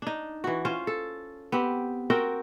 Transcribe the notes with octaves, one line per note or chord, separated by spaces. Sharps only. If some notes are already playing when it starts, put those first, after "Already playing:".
D4 D#4
E3 F#4
C#4 F4 C5
A4
B3 C4 G4
C4 F#4 A#4 G5